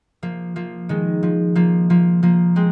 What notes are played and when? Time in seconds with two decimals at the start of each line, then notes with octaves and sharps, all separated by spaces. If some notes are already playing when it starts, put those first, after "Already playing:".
0.23 F3 A#3
0.56 F3 A#3
0.89 D#3 G#3
1.23 F3
1.55 F3 A#3
1.90 F3 A#3
2.23 F3 A#3
2.56 G#3 C4